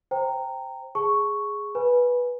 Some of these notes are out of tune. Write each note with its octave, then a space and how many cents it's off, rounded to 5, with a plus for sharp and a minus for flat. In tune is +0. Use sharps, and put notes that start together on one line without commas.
C5 +0 G5 +0 A#5 -15
G#4 +0 A5 +0 C#6 +0
B4 -10 G#5 +0 B5 -20